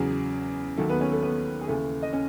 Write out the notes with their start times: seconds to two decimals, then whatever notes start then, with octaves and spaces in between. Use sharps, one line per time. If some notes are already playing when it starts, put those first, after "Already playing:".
Already playing: E2 C#3 F#3 G#4
0.77 D#2 D#3 F#3 A3 A4
0.89 B3 B4
1.00 C#4 C#5
1.11 A3 A4
1.23 B3 B4
1.61 G#4
1.68 D#2 C#3 E3 A3 A4
2.03 D#5
2.13 C#4